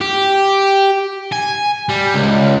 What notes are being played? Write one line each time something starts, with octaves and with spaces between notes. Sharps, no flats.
G4
G#5
G3
C#2